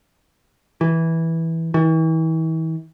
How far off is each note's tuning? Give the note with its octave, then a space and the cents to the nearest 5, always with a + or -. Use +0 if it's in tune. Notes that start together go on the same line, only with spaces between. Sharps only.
E3 -10
E3 -40